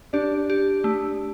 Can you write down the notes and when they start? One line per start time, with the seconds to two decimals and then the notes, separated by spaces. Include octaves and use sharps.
0.13 D4 G4
0.50 G4
0.84 A3 D4